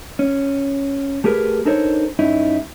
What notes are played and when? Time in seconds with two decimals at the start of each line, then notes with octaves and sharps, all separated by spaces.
0.19 C#4
1.24 A3 G4 G#4 A#4 B4
1.65 D4 D#4 A4 A#4 C5 C#5
2.19 G2 C#4 D#4 E4